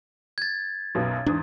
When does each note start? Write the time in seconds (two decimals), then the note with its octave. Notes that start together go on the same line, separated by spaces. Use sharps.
0.38 G#6 A6
0.95 B1 F#2 B2
1.26 E2 G#2 D4 D#6